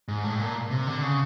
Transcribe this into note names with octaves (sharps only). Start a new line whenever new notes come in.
G#2
A2
A#2
C3
D3
C#3